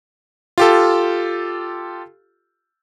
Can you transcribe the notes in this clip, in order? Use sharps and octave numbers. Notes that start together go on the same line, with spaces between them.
F4 G4 A4